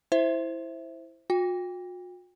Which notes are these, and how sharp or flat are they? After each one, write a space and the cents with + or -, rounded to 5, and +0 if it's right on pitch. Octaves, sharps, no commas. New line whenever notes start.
E4 +0 C5 +0 E5 +0
F#4 -45 G5 +30